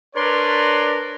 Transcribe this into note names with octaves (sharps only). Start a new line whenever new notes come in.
D4 A#4 B4 C#5 D5 C6